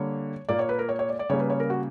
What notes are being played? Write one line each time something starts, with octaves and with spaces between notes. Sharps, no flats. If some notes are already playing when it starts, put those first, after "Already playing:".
Already playing: D3 G3 A#3 C#5
A#2 A#3 D5
C#5
B4
A#4
C#5
C#5
D5
D5
C#3 G3 A#3 C#5
B4
C#5
A#4
F#4